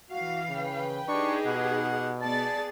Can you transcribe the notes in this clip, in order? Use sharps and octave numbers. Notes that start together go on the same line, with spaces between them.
E3 F#4 F5
C#3 B4 G5
D4 D#4 G4 G#4 C#6
B2 F#5
B3 G#4 D5 A5 A6